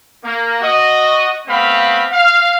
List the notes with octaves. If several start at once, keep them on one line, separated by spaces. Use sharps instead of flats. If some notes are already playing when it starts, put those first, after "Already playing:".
A#3
F#4 D#5
A3 B3 C4 F5 B5
F5